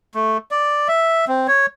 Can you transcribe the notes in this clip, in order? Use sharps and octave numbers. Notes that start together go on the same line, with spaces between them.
A3
D5
E5
C4
C#5